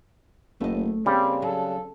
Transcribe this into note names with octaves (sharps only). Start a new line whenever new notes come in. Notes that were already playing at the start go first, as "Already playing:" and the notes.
F#1 A3 D#5
C#3 G3 A#3 C4
F#3 A4